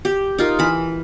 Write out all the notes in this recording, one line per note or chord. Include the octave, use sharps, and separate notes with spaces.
G4
D#4 F4 A#4
E3 B5